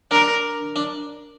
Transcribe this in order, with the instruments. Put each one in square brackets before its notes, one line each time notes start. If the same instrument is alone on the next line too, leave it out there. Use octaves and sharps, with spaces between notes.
[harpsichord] D4 [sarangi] A#4
[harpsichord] D4